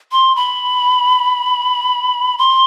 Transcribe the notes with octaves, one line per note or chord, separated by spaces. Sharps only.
C6
B5
C6